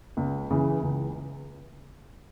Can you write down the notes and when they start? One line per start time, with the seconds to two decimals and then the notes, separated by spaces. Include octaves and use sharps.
0.17 C#2
0.50 C#3 E3
0.82 C#2